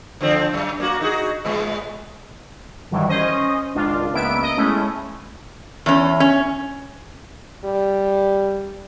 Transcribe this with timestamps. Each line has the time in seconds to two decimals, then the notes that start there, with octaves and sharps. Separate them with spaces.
0.21 D3 F3 C4
0.53 F#2
0.80 A#3 F#4
1.01 D#4 F#4 G#4
1.45 A2 G#3 B3
2.91 G2 D#3 E3 F#3 G3
3.09 C#4 C5 D#5
3.75 G#1 C#2 D4 F4
4.13 C#2 A#3 B3 E5 D7
4.42 D#5
4.57 G#3 A3 C#4 E4
5.86 E2 C#4
6.20 C#4
7.65 G3